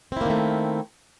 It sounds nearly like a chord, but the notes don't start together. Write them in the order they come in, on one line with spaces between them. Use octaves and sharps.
C4 E4 A#3 D#3 A3